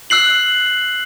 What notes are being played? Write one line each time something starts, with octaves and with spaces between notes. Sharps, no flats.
E6 F#6 C7 F#7